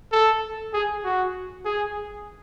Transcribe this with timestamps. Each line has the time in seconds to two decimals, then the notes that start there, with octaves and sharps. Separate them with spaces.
0.12 A4
0.73 G#4
1.04 F#4
1.65 G#4